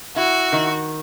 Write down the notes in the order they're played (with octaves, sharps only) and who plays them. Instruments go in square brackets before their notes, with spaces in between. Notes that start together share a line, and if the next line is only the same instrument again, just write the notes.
[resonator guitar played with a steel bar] E4 [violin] F#4
[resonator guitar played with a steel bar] D#3